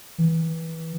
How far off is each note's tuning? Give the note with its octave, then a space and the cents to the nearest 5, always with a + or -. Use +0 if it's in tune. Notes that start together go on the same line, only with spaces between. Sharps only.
E3 -20